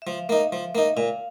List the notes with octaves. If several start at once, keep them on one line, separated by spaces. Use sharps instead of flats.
E5
F3 F5
A#3 D#4
F3
A#3 D#4
A#2 F5